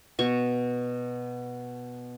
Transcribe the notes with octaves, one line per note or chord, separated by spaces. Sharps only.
B2 C#6